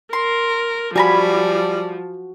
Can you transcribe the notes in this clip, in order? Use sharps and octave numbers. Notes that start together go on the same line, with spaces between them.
A#4 C6
F3 G3 F#4 G#5 A#5 B5